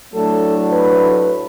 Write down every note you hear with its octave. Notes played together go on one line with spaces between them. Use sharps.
A2 F#3 A3 D4 A4
B4